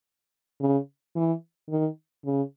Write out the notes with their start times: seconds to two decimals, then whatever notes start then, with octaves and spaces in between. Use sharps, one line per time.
0.60 C#3
1.16 E3
1.69 D#3
2.25 C#3